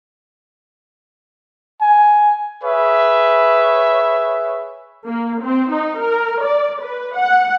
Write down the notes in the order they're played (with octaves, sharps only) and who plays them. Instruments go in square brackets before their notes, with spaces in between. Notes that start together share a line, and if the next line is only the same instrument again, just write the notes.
[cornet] G#5
[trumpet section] G#4 B4 C#5 E5
[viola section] A#3
C4
D#4
A#4
D5
B4
F#5